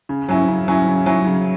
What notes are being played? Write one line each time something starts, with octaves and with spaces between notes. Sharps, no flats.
C#3
F#3 C#4 E4
C#3
F#3 C#4 E4
C#3
F#3 C#4 E4
C#3